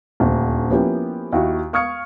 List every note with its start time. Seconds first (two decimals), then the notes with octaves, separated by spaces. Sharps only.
0.20 D#1 D2
0.70 F3 A#3 B3 C#4 E4 G4
1.32 D#2 E4 F#4
1.73 F5 C#6 D#6 F6 G#6 C#7